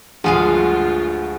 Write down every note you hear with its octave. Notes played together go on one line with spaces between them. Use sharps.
D2 G2 F3 G#3 F4 G#4 F5 F#5